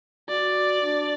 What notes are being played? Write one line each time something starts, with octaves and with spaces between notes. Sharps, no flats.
F#4 D5
D4